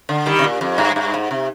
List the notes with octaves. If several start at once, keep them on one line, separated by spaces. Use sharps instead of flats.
D3
D#3 G3
C3
A#2
F2
G2
G2
G#2
C3